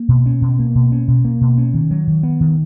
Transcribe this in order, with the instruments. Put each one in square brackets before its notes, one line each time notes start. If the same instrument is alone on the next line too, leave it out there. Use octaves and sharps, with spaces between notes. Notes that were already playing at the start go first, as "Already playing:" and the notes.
Already playing: [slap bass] A#3
B2
C#4
B2
A#3
B2
C#4
B2
A#3
B2
C#4
D#3
F#3
D#3
B3
D#3